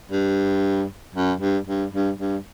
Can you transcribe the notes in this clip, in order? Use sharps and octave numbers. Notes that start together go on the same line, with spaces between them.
G2
F#2
G2
G2
G2
G2